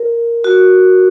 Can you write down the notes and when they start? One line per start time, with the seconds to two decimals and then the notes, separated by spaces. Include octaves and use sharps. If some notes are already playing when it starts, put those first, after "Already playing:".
Already playing: A#4
0.44 F#4